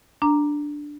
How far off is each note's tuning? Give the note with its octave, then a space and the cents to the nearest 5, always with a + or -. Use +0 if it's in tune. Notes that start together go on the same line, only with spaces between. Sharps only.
D4 +0 A#5 +0